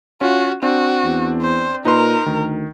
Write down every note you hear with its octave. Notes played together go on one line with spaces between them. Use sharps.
C#4 F4 F#4
C4 D4 F#4
E2
C5
A#2 D#4 A#4 B4 C6
D2 D#3